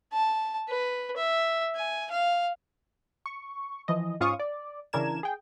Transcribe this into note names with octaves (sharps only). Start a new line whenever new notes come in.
A5
B4
E5
G#5
F5
C#6
E3 F3 D#5
G#2 C#4 F4 F5 C#6 D#6
D5
C#3 E3 D4 A#4 G#6 E7
G#4 G5